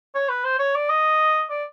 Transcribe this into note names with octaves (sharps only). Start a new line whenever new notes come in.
C#5
B4
C5
C#5
D5
D#5
D5